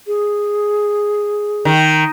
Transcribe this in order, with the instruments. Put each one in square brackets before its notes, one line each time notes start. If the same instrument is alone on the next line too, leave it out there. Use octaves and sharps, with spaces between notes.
[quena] G#4
[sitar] D#3